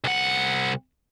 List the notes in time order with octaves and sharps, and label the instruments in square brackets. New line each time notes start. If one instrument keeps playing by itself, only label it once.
[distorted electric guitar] C2 F#5